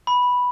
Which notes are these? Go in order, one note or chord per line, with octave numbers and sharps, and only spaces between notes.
B5